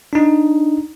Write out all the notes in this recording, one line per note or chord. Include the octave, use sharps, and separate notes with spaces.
D4 D#4